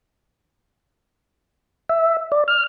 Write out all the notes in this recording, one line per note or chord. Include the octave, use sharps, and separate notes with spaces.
E5
D5
F6